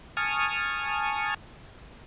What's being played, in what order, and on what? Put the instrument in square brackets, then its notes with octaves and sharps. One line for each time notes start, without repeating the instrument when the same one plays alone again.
[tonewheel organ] G#5 A5 C#6 D#6 F6